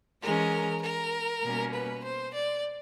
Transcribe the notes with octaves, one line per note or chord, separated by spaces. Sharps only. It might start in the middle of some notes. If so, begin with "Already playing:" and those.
E3 G#3 C#4 A#4
A#4
B2 G3 A#3 C#4
B4
C5
D5